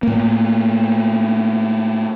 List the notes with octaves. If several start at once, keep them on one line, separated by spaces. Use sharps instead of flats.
A2 A#3